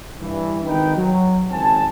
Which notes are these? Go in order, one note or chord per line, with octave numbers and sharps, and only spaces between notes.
G2 E3
G#1 D#3 D#4 B4 G5
F#3
G#1 C#2 C4 G#5 A5